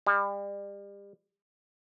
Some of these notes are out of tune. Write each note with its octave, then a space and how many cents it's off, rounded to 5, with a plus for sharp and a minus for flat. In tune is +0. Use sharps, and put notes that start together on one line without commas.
G3 +35